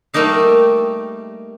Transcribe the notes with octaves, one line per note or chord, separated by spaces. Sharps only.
G3 A3 A#3 D#4 F5